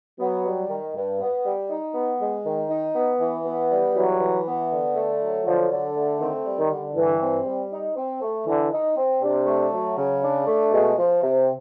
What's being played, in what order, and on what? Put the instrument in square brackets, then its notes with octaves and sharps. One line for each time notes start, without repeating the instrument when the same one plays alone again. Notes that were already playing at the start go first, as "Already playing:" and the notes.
[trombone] F#3 [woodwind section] B3
[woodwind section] G3
D#3
G2
B3
G3
D#4
B3
G#3
D#3
D#4
B3
E3
B3
G3
[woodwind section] E3 [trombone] F#3
[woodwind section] E3
B3
D3
A3
F#3
[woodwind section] D3 [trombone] F3
[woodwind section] D3
A3
[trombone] D#3 [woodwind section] C4
[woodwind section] G3
[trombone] D#3
[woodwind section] D3
[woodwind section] G2 [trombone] E3
[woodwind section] C4
G3
D#4
C4
A3
[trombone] D3 [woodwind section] E3
[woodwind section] D#4
C4
[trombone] C3 [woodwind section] D4
[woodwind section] A3
F#3
C#3
D4
A3
[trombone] B2 [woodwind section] G#3
[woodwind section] F3
C3